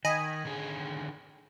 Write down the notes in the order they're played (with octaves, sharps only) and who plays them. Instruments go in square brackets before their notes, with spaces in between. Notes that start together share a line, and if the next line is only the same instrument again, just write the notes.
[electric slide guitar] D#3 [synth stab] D#5 G#5 B5
[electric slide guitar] D3 D#3 G#4